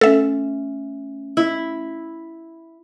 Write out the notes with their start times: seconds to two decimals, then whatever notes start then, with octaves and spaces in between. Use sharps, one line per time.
0.01 A3 C#4 A4 E5
1.37 E4